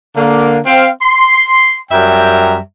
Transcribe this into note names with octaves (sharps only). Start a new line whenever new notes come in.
D3 A#3
C4 F5
C6
F#2 G3 E5 G5 A#5